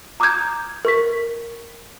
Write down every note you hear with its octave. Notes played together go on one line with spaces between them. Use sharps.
A#5 D6 D#6 F6 G6 G#6
A#4 C#6 B6